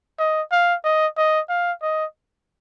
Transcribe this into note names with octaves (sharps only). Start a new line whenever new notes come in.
D#5
F5
D#5
D#5
F5
D#5